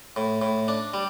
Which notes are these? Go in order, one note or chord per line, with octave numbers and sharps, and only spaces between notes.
A2
A2
D4
G3